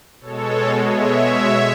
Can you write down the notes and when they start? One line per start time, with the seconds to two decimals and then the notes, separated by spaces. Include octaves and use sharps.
0.20 B2 G#3 A4 C#5
0.88 C#5 E5